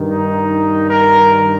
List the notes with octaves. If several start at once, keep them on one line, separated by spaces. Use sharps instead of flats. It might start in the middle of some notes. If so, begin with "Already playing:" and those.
Already playing: G2 D#3
D#4
A#4